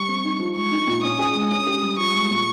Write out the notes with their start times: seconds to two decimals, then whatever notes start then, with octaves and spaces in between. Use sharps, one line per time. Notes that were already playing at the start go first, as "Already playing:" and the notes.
Already playing: G3 C#6
0.08 C4
0.24 D#4
0.39 F3
0.56 G#3 C#6
0.72 D#4
0.87 A#2
1.03 C#4 D#6
1.19 G#4
1.35 G#3
1.50 C#4 D#6
1.67 G4
1.83 G3
1.98 F3 C#6
2.14 G#3
2.30 A#2